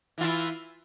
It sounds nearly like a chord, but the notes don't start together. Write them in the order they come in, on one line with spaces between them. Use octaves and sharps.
E3 F4 E4